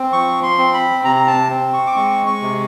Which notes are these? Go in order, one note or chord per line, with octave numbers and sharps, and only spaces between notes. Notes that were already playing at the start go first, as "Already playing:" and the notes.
Already playing: C4
F3 C#6
C6
C4
B5
C3 A#5
A#5
A5
C4
C#6
D6
G#3 C#6
C#6
C3